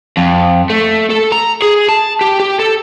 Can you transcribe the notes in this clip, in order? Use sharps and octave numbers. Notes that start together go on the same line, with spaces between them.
F2
A3
A4
A#5
G#4
A5
G4
G4
A4